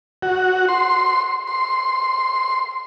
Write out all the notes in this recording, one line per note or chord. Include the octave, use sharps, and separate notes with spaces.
F#4
C6
C6